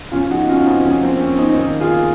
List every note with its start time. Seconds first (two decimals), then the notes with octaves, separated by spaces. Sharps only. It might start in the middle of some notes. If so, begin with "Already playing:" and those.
0.12 C#3 F3 A#3 C#4 F4
0.30 D#4 F#4
0.48 C#4 F4
0.67 C4 D#4
0.84 C#3 F3 A#3 C#4
1.03 C4
1.21 C#4
1.38 C4 D#4
1.56 D#3 A#3
1.81 F4 G#4